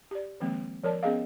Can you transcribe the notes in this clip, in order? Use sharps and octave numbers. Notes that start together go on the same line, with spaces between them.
G4 D5
D#3 F3 G#3 A#3 C4
F3 A#4 C#5 D5 A5
B3 C#4 G#4 D#5 F5